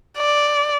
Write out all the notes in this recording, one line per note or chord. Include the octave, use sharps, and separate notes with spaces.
D5